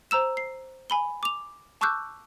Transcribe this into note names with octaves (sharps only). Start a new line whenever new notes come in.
C5 A#5 E6 E7
C7
G#5 B5 G7
D6 F7
A5 C#6 D6 E6 F#6 G6